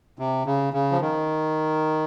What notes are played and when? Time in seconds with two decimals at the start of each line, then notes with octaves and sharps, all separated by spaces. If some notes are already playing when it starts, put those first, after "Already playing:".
0.19 C3
0.46 C#3
0.73 C#3
0.91 F3
1.01 D#3